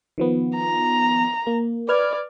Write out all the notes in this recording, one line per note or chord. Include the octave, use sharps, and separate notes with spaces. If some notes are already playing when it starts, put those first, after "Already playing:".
D#3 F3 B3
A#5
A#3
B4 D5 F6 G#6